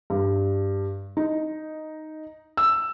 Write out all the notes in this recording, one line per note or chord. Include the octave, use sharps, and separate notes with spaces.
G2
D#4
E6